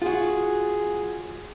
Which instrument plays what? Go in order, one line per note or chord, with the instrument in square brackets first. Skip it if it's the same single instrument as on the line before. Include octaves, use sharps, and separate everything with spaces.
[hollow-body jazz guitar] F4 F#4 [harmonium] G#4